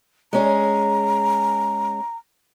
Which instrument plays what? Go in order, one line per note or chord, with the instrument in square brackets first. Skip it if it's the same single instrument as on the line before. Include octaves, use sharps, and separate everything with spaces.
[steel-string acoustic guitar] G#3 C#4 G#4 [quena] A#5